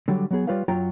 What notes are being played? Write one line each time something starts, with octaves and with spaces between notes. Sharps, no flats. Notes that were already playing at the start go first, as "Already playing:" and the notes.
D3 F#3 G3
F#3 B3 G#4
G3 F4 B4 C#5 F5
F#2 F#3 F4 G5 A#5